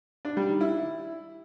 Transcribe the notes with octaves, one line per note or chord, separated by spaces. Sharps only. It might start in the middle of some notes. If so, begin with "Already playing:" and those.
D4
G3
D#3
E4